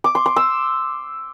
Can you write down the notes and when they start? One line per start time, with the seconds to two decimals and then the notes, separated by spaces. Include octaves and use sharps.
0.04 D6
0.15 C6
0.26 C6
0.36 E6